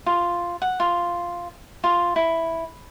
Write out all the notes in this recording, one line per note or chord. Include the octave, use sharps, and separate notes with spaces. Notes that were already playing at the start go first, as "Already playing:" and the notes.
F4
F#5
F4
F4
E4